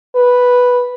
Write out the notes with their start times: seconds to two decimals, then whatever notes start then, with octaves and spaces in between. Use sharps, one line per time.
0.16 B4